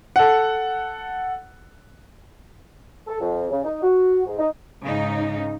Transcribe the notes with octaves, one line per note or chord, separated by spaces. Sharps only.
A4 F#5
A4
F2
C#3
D#4
F#4
G#2
D#4
G#2 C#3 D#4